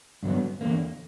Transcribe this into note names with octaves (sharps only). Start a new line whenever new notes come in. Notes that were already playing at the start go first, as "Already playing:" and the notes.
G2 D3 F#3 B3
E2 D3 A#3